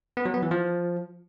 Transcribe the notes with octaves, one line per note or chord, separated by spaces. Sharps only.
B3
F#3
B3
E3
F3